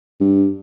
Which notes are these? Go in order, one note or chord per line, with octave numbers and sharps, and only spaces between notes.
G2